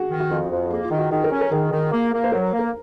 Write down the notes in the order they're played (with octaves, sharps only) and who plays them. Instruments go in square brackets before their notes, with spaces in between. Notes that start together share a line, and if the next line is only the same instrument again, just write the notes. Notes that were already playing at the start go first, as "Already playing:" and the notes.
Already playing: [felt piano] F#4 G#4
[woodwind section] D#3
[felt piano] F#4
[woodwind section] F2 [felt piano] F4
[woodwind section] F2
[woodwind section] A#3 [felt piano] G#4
[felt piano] F4
[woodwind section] D#3
[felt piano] F#4
[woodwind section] D#3 [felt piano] G#4
[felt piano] A#4
[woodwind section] C#4
[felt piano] A#4
[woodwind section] D#3 [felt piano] G#4
[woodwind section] D#3
A#3
A#3
[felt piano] C5
[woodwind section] F#3 [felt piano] A#4
[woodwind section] A#3
[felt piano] A#4